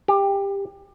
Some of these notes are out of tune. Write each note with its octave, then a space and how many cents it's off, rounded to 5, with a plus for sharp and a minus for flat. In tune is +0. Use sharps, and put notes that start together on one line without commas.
G4 +20